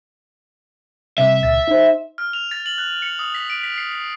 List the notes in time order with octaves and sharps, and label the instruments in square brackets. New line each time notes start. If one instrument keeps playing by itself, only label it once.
[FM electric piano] C3 G3 [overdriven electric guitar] E5
[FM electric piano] C#2 A#2 A6
D#4 C5
[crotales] F6
F7
A6
F#7
F#6
C#7
D#6
B6
D7
B6
C7
C7